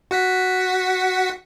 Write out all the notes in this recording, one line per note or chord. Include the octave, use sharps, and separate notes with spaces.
F#4 F#5 B6